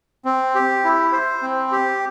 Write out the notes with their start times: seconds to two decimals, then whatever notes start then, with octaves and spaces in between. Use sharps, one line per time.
0.25 C4
0.55 G4
0.84 E4
1.12 C5
1.42 C4
1.72 G4